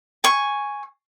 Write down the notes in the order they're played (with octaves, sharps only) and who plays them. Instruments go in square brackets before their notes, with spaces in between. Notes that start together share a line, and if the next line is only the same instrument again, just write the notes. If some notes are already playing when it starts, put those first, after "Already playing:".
[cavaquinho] G#5 C#6